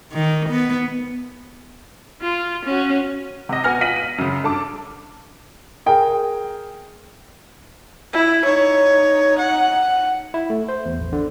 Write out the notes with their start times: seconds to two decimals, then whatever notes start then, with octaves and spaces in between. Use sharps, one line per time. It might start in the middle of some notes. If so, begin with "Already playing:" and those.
0.12 D#3
0.50 B3
2.21 F4
2.65 C#4 F#4
3.49 C3 D#5
3.64 B2 B3 G#5 F6 A#6
3.81 F4 D#5 B6 D#7 F#7
3.96 D#7
4.18 F#2 C#3
4.44 G2 A4 A5 D6
5.86 G#4 A#4 G5
8.13 E4
8.44 D#4 C#5
9.39 F#5
10.34 E4
10.50 A3
10.69 C5
10.86 E2
10.99 A1
11.13 D3